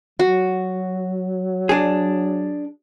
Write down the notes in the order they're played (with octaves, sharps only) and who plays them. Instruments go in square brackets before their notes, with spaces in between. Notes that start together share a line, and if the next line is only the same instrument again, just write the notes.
[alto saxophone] F#3 [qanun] F#4
[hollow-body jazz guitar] D4 G#4